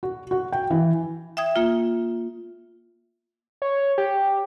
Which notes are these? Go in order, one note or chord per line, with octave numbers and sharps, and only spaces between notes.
F#4
F#4
G5
E3
E5 G5 D#6 G#6
A#3 F4
C#5
G4